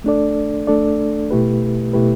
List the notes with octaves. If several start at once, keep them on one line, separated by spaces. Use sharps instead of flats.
A3 D4 A4 D5
A3 D4 A4 D5
B2 A3 E4 G4 B4
B2 A3 E4 G4 B4